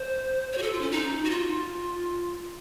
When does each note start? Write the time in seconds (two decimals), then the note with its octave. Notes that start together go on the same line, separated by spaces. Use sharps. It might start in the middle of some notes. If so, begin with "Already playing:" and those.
Already playing: C5
0.52 C#5
0.58 F#4
0.62 A4
0.72 F4
0.81 C#4
0.91 D#4
1.25 F#4
1.30 F4